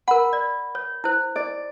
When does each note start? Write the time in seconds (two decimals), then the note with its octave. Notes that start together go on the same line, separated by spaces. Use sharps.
0.08 A#4 F#5 B5
0.33 D5
0.75 C#5
1.04 E4 C5
1.36 D5